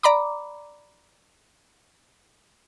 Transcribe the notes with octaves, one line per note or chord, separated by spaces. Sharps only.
D5 A#5 B5 D6